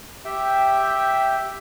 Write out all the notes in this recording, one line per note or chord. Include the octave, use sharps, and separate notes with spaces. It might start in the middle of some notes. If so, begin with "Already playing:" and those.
G4 E5 G5